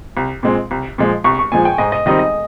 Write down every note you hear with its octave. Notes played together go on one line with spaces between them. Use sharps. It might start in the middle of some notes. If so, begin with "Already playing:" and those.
C2
A#2 G#3 C4
C2
A#2 F3 G#3
C2 C#6
C#6
A#2 F3 G#3 G#5
G5
G#2 D#5
D#5
D#3 G3 C4 D#4 D#5
D#5